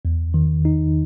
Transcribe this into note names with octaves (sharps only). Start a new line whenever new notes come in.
E2
D#3
D#4